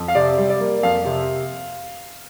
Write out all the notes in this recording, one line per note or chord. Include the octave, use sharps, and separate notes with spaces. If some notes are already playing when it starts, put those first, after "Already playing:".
Already playing: F2
F5
C3 D5
G3
D5
A#3
F2 F5
C3